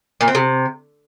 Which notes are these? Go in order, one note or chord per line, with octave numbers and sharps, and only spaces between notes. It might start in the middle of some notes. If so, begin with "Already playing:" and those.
A#2
C4
C3